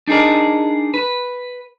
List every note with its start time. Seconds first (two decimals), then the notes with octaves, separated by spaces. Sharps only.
0.08 D4 D#4 G#4 A#4 D5
0.94 B4